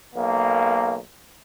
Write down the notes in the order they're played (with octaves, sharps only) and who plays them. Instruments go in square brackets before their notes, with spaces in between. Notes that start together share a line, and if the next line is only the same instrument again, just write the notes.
[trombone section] B1 A#3